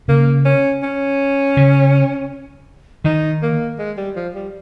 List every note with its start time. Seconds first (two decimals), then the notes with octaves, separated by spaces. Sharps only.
0.08 C#3 A#3
0.45 C#4
0.83 C#4
1.57 C#3
3.04 D#3 D#4
3.42 A#3
3.79 G#3
3.97 G3
4.16 F3
4.35 G3